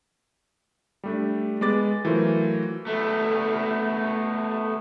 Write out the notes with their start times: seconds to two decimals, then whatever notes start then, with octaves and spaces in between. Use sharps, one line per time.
1.04 G3 A3 D4
1.61 G#3 B3 D6 A6
2.05 E3 F#3 A3 F4 A#4 C5
2.87 A3 B3